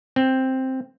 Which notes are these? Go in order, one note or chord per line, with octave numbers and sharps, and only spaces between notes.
C4